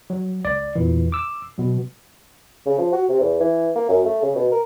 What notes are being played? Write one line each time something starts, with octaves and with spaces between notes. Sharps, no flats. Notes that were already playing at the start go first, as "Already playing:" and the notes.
F#3
C#2 D5
E2 A#2 E3
D6 E6
B2 F#3
C#3
F3
F#4
C3
E2
E3
A#3
F#2
A3
C#3
B2
A#4